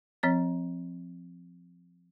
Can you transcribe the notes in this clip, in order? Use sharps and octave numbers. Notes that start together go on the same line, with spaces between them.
F3 C4 C#5 A6